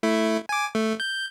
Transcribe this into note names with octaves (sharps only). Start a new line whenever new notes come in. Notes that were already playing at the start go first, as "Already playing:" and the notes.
A3 E4
G#5 D6
A3
G6